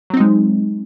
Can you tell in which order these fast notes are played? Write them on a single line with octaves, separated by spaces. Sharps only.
F#3 C4 D#4 G#3